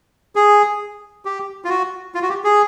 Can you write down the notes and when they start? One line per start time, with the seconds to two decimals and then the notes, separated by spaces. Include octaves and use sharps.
0.36 G#4
1.25 G4
1.64 F4
1.69 F#4
2.15 F4
2.22 F#4
2.29 G4
2.44 G#4